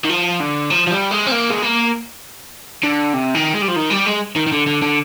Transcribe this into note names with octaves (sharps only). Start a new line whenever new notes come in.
D#3
F3
D3
F3
F3
G3
G#3
C4
A#3
G#3
A#3
D3
C3
D#3
G#3
G3
F3
D#3
G3
G#3
D#3
D#3
D3
D3
D3